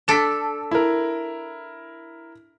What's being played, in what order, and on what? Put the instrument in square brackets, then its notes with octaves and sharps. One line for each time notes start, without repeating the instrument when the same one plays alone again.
[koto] D4 A4 [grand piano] B6 D7 E7
[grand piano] E4 A#4